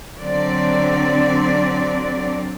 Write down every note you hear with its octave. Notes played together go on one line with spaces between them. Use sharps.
D3 F#3 C4 D5